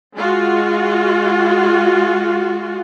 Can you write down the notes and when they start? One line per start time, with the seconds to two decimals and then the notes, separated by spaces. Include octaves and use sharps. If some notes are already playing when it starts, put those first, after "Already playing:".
0.15 G#3 F4 F#4